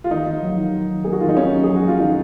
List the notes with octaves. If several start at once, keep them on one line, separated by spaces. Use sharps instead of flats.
F4
D#3 D#4
D#3
F#3
D#3
D#3
D#3
A#3 G#4
F#4
D#3 F4
D#4
D#3 C#4
F#3
F#3 G#4
F#4
F#3 F4
D#3 D#4